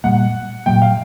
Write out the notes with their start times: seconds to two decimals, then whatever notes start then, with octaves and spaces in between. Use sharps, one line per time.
0.04 A#2 G3 A#3 F#5
0.66 A#2 F#3 A#3 G5
0.82 F5